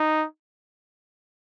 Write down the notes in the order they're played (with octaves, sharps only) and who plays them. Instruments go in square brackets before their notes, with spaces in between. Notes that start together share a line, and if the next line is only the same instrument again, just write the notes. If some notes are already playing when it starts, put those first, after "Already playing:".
Already playing: [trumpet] D#4